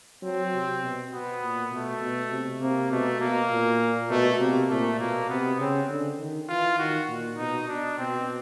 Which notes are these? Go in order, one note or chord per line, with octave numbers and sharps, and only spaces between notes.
F#3 C4
C3
B2
B2 B3
A#2
B2 A3
B2
C3
C3 A#3
B2 A3
B2 A#3
A#2
B2 A3
C3 A#3
A#2 A3
B2 A#3
C3 B3
C#3 C4
D3
D#3
E3 F4
D#3 F#4
A#2
B2 D#4
D4
B2 C4